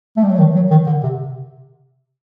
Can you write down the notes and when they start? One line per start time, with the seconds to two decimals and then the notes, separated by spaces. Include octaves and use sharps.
0.17 A3
0.24 G3
0.31 F#3
0.39 D#3
0.55 F#3
0.70 D#3
0.87 D3
1.03 C3